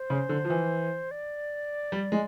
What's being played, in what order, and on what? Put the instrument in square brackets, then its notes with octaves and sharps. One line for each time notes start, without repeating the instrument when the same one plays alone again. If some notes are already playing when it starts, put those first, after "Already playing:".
Already playing: [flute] C5
[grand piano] C#3
D3
F3
E3
[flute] D5
[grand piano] G3
G#3